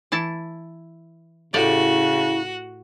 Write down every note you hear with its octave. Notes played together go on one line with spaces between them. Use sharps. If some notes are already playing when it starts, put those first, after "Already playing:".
E3 E4 A5
A2 C#3 E4 F#4 G4 D5